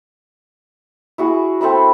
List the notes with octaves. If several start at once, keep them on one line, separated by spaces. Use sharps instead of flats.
E4 F#4 G#4
C4 A4 E5 B5